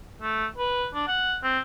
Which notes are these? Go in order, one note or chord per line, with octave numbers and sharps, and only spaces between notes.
A3
B4
D4
F#5
C4